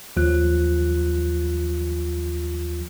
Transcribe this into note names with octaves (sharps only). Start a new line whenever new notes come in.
D#2 F3 F4 F#6